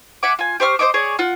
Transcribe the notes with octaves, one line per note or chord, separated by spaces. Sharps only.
E5 F#5 G#5 D6
F4 G#5
G4 C5 C#6 F6
C5 C#5 D#5 D6
G#4 C#5 D5
F4 F#5